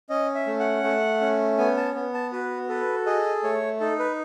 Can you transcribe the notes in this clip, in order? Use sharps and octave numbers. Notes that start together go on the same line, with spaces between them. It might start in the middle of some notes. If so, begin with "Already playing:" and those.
C#4 D#5
E5
A3
F#5
A3
C#4
B3 G#5
A5
B3
A5
F#4 B4
A4 B4
G#4 D#5
A3 C#5
D#4 A4
B4